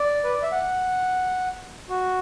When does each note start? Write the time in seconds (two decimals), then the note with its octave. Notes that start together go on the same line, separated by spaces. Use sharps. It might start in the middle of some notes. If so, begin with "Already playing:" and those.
Already playing: D5
0.24 B4
0.34 D5
0.43 E5
0.52 F#5
1.89 F#4